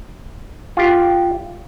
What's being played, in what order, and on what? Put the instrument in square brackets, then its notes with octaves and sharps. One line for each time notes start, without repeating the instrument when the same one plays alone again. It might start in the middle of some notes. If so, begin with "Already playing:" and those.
[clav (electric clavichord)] F4 G4